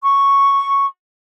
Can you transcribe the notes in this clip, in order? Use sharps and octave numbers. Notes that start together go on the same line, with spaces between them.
C#6